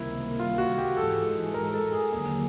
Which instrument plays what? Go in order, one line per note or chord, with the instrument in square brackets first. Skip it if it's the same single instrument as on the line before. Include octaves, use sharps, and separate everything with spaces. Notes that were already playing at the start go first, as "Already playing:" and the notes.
Already playing: [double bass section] C#2 C3 D#3 G3 A#3 [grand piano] E4
[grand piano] F4
F#4
G4
[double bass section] G#2 E3 G#3 [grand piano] A4
[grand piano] A#4
A4
G#4
[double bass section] D#2 D3 F#3 A#3 [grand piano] G#4